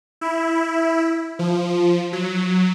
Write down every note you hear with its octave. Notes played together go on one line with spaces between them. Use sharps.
E4
F3
F#3